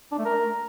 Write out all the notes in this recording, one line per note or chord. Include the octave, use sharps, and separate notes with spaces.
D4
A3
A#4